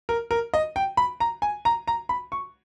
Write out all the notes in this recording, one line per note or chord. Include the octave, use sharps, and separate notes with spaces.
A#4
A#4
D#5
G5
B5
A#5
G#5
A#5
A#5
B5
C#6